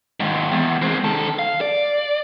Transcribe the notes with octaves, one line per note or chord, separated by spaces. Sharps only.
D#2 G#2
E2
G#3 C4
D#3 A4
F5
D5